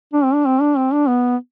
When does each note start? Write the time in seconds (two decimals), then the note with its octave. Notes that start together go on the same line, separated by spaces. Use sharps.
0.13 D4
0.24 C4
0.34 D4
0.46 C4
0.61 D4
0.77 C4
0.93 D4
1.08 B3